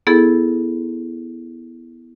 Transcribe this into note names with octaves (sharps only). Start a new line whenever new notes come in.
B3 E4 G#4 A4